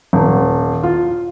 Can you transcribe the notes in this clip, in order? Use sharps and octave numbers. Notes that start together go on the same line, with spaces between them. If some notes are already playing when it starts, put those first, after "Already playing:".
D#1
F4